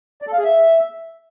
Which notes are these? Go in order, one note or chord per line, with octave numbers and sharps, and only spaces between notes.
D5
A4
F5
G#4
E5